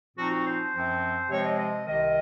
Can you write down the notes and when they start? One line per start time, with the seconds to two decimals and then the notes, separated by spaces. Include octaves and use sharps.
0.17 A#2 F3 C4 D#4 F#4
0.31 F#4
0.46 C5
0.74 F#2 F3 C4
1.29 C3 F3 G#3 C4 C#5
1.44 D#5
1.58 D#5
1.86 C2 C3 D#3 D#5